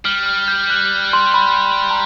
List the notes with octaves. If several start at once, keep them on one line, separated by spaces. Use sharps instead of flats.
G3 F6
F6
G6
F#6
C6
B5
A#5